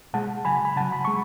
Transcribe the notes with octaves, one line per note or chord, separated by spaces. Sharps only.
B2 G#3 F#5 A5
C#3 F#3 G#5 B5
B5
C#3 F#3 F#5 A5
B5
G#3 C#6